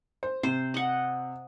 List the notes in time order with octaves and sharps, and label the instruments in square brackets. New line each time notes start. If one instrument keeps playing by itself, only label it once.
[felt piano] C5
[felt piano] C3 [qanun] C5
[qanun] D#5 F#5